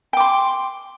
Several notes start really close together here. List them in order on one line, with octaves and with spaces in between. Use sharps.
G5 D6 C6